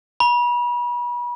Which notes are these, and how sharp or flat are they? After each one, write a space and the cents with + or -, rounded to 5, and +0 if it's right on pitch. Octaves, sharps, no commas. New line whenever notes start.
B5 -35